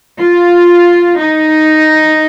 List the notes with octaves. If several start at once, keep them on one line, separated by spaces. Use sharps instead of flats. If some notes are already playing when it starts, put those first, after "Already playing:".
F4
D#4